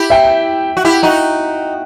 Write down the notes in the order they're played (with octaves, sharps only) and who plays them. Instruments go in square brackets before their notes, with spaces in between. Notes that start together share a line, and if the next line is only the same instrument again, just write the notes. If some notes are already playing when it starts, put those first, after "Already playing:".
Already playing: [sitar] E4 G4
[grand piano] E5 G5
[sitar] F#4
E4 G4
D#4 F#4